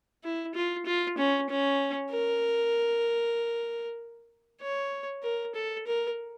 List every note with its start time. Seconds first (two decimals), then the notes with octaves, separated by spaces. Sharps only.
0.24 E4
0.55 F4
0.86 F4
1.18 C#4
1.49 C#4
2.11 A#4
4.61 C#5
5.23 A#4
5.55 A4
5.87 A#4